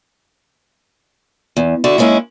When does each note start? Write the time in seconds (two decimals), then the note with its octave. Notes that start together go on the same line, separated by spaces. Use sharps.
1.57 E2
1.84 D3 E4 F#4
1.98 G#3 A#3 C#4 D#4 E4